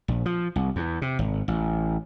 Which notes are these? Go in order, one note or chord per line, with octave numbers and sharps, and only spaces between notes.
A#1
F3
C2
E2
C3
G#1
A1